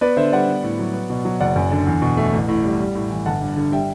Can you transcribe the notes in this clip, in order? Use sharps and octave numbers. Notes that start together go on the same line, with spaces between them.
B3 B4 D5
D3 C5 E5
G3 D5 F#5
B3
A2
F#3
B3
B2
F#3
F#1 D5 F#5
F#2
D3
E2
B2
A3
A1
A2
G3
G3
A2
E3
G1 F#5 A5
G2
D3
G3 E5 G5